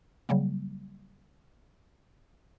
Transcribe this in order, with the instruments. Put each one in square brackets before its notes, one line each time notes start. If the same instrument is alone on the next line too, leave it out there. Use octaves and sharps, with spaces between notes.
[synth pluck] C#3 F#3 G3 A#3